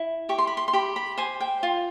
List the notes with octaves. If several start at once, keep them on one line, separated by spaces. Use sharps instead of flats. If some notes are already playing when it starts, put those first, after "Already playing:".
Already playing: E4
G4 C#6
C6
B5
C6
C6
G4 B5
B5
C5 G#5
G5
F4